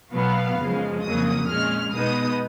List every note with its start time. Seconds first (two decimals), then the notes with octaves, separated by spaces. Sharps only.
0.12 B2 F#3 B3 F5
0.57 F#2 C#3 F3 G#3
1.02 F2 C#3 F#3 A#3 D#6
1.48 A#2 G#3 C#4 F6
1.92 B2 G#3 B3 D#4 D#6